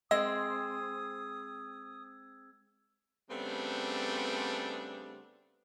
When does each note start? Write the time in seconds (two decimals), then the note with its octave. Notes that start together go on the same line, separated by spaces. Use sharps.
0.11 G#3 C4 D#5 D#6 E6 G#6
3.30 C#3 G3 A3 B3 C4 D4